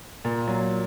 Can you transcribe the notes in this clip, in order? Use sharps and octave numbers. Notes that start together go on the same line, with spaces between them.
A#2
F#3